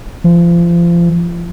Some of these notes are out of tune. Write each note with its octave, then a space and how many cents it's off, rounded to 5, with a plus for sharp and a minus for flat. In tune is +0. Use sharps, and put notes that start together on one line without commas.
F3 -30